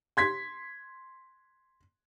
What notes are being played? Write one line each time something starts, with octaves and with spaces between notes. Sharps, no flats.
C6 G#6 B6